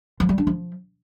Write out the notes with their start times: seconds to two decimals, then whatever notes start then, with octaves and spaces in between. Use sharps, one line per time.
0.20 F3
0.29 G3
0.38 D4
0.47 F3